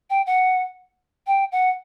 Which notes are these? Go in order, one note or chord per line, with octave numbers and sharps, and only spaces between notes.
G5
F#5
G5
F#5